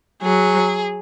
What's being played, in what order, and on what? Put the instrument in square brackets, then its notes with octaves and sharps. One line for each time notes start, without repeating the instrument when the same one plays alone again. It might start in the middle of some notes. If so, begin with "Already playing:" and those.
[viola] F#3 [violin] G#4